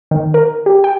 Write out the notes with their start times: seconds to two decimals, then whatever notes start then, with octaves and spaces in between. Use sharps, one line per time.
0.11 D#3
0.34 A#4
0.66 G4
0.84 G5